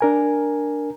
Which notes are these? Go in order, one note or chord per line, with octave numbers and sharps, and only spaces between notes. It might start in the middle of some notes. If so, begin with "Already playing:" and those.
D4 A#4 G#5